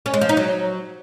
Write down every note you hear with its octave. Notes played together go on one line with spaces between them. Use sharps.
C#4
G#3
F3
D#4
F#3